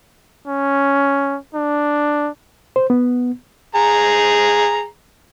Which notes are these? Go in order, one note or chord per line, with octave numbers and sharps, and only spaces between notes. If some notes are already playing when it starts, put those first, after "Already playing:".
C#4
D4
C5
B3
G#4 A#5